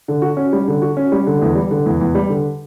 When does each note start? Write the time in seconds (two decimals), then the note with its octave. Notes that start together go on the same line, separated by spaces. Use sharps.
0.08 D3
0.22 F#4
0.37 C#4
0.53 G3
0.68 D3
0.82 F#4
0.97 C#4
1.12 G3
1.27 D3
1.42 E2
1.55 G3
1.71 D3
1.86 E2
2.01 E2
2.15 G3
2.30 D3